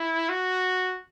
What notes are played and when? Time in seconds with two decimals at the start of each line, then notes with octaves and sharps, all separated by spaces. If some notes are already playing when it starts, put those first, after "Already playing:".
Already playing: E4
0.29 F#4